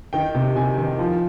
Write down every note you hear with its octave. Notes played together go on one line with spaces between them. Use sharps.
D#3 G5
C3
C3 G#5
D#3
F3